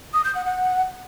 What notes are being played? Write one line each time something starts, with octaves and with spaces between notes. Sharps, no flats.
D#6
G6
F#5
F#5